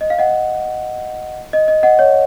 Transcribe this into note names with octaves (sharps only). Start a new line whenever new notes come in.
D#5
F5
D#5 F#5
D#5
D#5
D#5 F#5
C#5